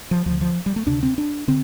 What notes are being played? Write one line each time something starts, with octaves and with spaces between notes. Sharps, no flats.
F3
D2 F3
D3
F3
G3
A3
D2 C3 D4
C4
D4
D3 C4